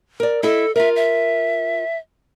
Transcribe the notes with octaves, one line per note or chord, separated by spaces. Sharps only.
A#4 D5
E4 A4 D#5 E5
F4 A#4 E5
E5